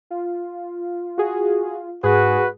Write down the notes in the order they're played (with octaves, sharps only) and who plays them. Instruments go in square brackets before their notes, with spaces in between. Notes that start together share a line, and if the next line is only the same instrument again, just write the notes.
[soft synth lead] F4
[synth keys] F#4 G#4
[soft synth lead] G#2 [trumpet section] F#4 B4 [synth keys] G#4